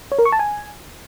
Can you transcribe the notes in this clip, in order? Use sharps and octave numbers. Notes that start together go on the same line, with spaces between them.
C#5
A#4
C#6
A5
G#5